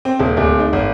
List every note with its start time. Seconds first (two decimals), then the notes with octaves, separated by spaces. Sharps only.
0.05 C4
0.19 D#1
0.37 D1
0.60 D#4
0.73 G#1